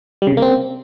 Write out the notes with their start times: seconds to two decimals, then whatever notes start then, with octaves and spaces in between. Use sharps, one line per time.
0.22 G3
0.27 C#3
0.32 C3
0.37 A#3
0.42 C4